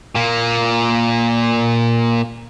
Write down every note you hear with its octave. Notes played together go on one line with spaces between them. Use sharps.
A#2 A#3